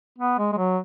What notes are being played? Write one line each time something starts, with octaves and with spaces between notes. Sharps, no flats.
B3
G#3
G#3
F#3